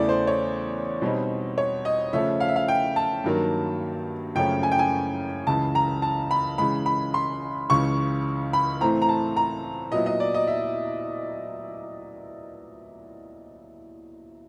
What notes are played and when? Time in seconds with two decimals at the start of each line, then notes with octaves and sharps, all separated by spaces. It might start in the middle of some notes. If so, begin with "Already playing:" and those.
Already playing: E2 C#3 E3 A3 D5
0.09 C5
0.27 C#5
1.02 B2 G3 C4 D#4
1.58 C#5
1.85 D#5
2.13 C#3 F3 A3 C#4 E5
2.40 F5
2.48 E5
2.56 F5
2.68 G5
2.96 A5
3.24 G2 D#3 F#3 A#3
4.35 F#2 C#3 F3 A3 C#4 G5
4.63 G#5
4.72 G5
4.79 G#5
5.47 C#2 C#3 E3 A5
5.75 A#5
6.02 A5
6.31 B5
6.58 C#3 E3 G#3 B5
6.86 B5
7.14 C6
7.69 C#2 C#3 E3 C#6
8.53 B5
8.81 A2 E3 A3 C4 A#5
9.02 A#5
9.09 A5
9.37 A#5
9.92 A#2 F#3 B3 E4 D#5
10.06 D#5
10.20 D5
10.34 D#5
10.47 E5